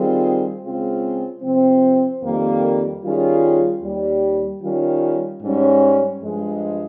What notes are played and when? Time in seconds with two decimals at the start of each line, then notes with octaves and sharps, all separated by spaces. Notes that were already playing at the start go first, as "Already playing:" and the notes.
Already playing: D#3 G3 C4 F4 G#4
0.62 C#3 G#3 C4 F4 G#4
1.42 C3 F3 C4
2.22 F2 D#3 G3 A#3
3.02 D#3 G3 C#4 F4 G#4
3.82 D#2 D#3 G3
4.62 D#3 G3 C#4 F4
5.42 G#2 G3 C#4
6.22 G2 F3 G#3